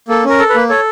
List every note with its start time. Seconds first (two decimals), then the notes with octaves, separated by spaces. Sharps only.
0.08 A#3 A4
0.25 C#4 A#4
0.39 A4
0.50 B4
0.55 A#3
0.70 A4 C#5